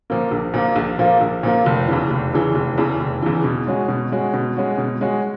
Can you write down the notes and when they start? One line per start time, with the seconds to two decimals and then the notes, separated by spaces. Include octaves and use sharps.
0.10 A#2 F3 A#3
0.31 A#1
0.54 A#2 F3 A#3
0.76 A#1
0.99 A#2 F3 A#3
1.21 A#1
1.43 A#2 F3 A#3
1.66 F1
1.88 E2 C#3 E3
2.10 F1
2.33 E2 C#3 E3
2.55 F1
2.78 E2 C#3 E3
3.00 F1
3.22 E2 C#3 E3
3.44 B2
3.67 G#3 C#4 F#4
3.88 B2
4.12 G#3 C#4 F#4
4.34 B2
4.57 G#3 C#4 F#4
4.78 B2
5.01 G#3 C#4 F#4